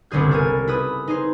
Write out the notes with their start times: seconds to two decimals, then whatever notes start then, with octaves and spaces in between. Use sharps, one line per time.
0.11 G1 C2 C#3 G#4 G6
0.31 A4 A#4 G#5
0.67 E4 B4 D#6
1.08 D#4 G#4 C5